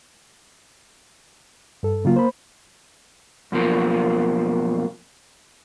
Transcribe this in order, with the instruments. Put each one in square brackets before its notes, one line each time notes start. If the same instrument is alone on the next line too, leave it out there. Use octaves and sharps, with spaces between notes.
[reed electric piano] G2 A4
[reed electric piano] C#3 F#3 F4 [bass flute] A#3
[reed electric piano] C5 B5
[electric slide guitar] F#2 B2 F3 A#3